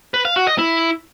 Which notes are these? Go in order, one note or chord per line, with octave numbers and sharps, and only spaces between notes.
B4
F5
F#4
D#5
E4